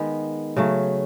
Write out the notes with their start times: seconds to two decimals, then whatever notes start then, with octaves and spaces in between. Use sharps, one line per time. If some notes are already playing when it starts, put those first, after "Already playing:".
Already playing: D#3 G#3 B3
0.56 C#3 F#3 A3